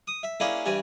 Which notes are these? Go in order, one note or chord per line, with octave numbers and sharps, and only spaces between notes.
D#6
E5
A#3 C#4 D4 E4 G#4
G2 E3 G3 G#5